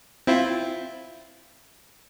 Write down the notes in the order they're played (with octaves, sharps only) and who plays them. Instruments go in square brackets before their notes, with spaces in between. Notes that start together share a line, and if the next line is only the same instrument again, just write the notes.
[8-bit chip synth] C4 E4 F4